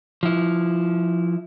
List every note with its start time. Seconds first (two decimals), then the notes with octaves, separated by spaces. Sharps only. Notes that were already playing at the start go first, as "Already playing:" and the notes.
0.23 F3 E4